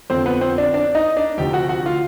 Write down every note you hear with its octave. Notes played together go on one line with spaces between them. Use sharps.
F2 D3 F3 C4 C5
B3 B4
C4 C5
D4 D5
D4 D5
D#4 D#5
D4 D5
D2 C3 F3 G4 G5
F#4 F#5
F#4 F#5
F4 F5